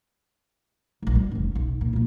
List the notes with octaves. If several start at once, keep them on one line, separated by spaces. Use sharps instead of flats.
D1 A#1
G3
F1 C#4
B1
A#2
A#2 A#3